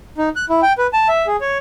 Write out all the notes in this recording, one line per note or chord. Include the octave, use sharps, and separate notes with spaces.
D#4
F#6
E4
G5
B4
A5
E5
G#4
C#5